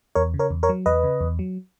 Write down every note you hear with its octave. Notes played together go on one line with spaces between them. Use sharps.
E2 A#4 C#5
C#3
A#4 C#5
E2
A#4 C#5
F#3
E2 B4 D#5
C#3
E2
F#3